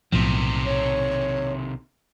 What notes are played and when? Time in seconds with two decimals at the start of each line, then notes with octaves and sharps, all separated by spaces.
0.12 B1 A2 C3 D#3 F3
0.65 C#5